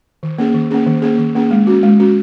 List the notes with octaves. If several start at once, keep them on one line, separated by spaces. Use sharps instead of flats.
D#3
A#3 C#4 G#4
D#3
A#3 C#4 G#4
D#3
A#3 C#4 G#4
D#3
A#3 C#4 G#4
G#3
C#4 F#4
G#3
C#4 F#4